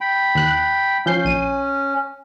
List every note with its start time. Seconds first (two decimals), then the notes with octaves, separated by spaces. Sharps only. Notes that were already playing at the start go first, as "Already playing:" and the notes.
0.01 G5 B5
0.35 D#2 F#6
1.06 F3 C#4 G6 C7
1.25 A#1 D#7